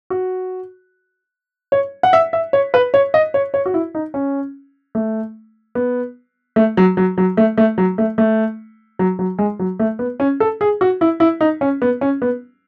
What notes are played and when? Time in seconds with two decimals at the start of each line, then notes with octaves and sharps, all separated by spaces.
0.10 F#4
1.72 C#5
2.03 F#5
2.13 E5
2.33 E5
2.53 C#5
2.74 B4
2.94 C#5
3.14 D#5
3.34 C#5
3.54 C#5
3.66 F#4
3.74 E4
3.95 D#4
4.14 C#4
4.95 A3
5.75 B3
6.56 A3
6.77 F#3
6.97 F#3
7.18 F#3
7.37 A3
7.58 A3
7.78 F#3
7.98 A3
8.18 A3
8.99 F#3
9.19 F#3
9.38 G#3
9.59 F#3
9.79 A3
9.99 B3
10.20 C#4
10.40 A4
10.61 G#4
10.81 F#4
11.01 E4
11.20 E4
11.41 D#4
11.61 C#4
11.82 B3
12.01 C#4
12.22 B3